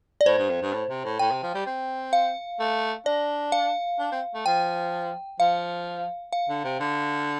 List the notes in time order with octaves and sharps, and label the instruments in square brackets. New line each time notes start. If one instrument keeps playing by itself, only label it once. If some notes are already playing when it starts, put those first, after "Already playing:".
[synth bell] D5
[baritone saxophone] A2 [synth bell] C5
[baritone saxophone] G2
F2
G2
A2
C3
A2
[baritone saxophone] A2 [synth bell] G5
[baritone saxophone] C3
F3
G3
C4
[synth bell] F5
[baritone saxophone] A3
[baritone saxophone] D4 [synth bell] D5
[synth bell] F5
[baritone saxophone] D4
C4
A3
[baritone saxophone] F3 [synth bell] G5
[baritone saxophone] F3 [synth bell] F5
[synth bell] F5
[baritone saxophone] D3
C3
D3